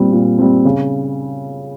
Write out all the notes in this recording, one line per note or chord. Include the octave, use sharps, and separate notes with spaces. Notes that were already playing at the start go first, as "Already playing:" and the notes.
Already playing: A#2 G3 C4
A#2
G3 C4
C#3